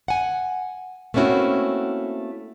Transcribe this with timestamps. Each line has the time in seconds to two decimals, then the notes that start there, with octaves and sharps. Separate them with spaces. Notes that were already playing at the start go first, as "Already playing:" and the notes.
0.08 F#5 G#5
1.14 A3 A#3 C4 C#4 E4 F#4